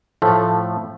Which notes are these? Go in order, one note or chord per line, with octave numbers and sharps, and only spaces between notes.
A2 F3 A3